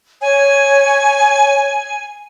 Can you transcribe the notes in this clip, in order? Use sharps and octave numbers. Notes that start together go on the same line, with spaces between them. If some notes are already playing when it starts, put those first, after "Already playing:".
C#5 G#5